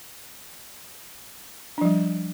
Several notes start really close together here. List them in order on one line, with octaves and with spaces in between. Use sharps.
D4 F3 G3